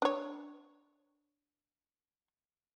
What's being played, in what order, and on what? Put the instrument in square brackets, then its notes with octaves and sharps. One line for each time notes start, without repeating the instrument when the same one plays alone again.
[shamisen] D4 C#5